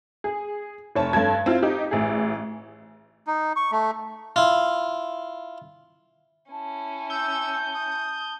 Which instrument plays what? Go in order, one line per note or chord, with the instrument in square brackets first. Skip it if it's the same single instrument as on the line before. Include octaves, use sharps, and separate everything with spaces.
[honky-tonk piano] G#4
F1 C#5 A5
G2 A4 A5 G#6
C4 E4 F4
D#4 G4
A1 G#4
[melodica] D#4
C#6
A3
[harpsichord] E4 F4
[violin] C#4 E4 [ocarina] A5
[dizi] E6 [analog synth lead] G6
[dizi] D#6